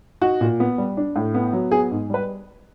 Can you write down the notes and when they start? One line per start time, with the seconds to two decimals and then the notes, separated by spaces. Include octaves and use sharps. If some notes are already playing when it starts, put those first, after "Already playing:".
0.21 D#4 F#4
0.41 A#2
0.60 B3
0.78 G3
0.97 D4
1.16 A2
1.34 B3
1.53 F#3
1.71 B3 G#4
1.91 G#2
2.10 G3 B4